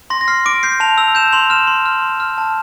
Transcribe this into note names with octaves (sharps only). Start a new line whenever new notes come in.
C6 A#6
A#6
F6 C7
D6 D7
G6 C7
A5 F7
E6 F7
G6 E7
C6 F7
F6 E7
C6
F6
C6
F6
A5